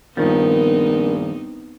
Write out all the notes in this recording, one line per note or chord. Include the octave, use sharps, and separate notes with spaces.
A#1 G2 D#3 F3 B3 C4 D#4 A#4